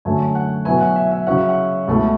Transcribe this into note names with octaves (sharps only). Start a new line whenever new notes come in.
F#2 D3 F#3 A3 G#5
F#5
B2 F#3 B3 E4 G#5
F#5
E5
E5
C#3 F#3 C#4 E4 F#5
E5
F#5
C#2 B2 A3 E4